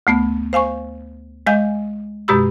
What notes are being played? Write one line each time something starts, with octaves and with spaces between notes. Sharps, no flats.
D2 A3 B3
C5 F5 G#5 C#6
G#3 D#5 F5 G#5 G6
F#2 B2 G#3 G4 B5 E6